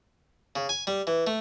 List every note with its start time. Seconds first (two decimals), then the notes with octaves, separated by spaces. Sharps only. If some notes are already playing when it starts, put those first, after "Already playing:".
0.56 C#3
0.69 G#5
0.87 G3
1.07 E3
1.27 A3